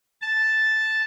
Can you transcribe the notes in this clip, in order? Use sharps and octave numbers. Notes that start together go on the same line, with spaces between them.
A5